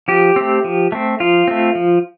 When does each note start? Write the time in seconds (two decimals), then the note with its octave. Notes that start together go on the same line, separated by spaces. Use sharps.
0.08 F3 G4
0.36 A3 C4
0.64 F3
0.92 A3 C4
1.20 F3 F4
1.48 A3 C4
1.75 F3